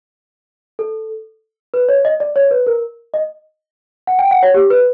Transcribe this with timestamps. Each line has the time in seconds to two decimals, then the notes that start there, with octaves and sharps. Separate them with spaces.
0.79 A4
1.74 B4
1.89 C#5
2.05 D#5
2.20 D5
2.36 C#5
2.51 B4
2.67 A#4
3.14 D#5
4.07 F#5
4.19 G5
4.31 F#5
4.43 C#5
4.54 G4
4.70 B4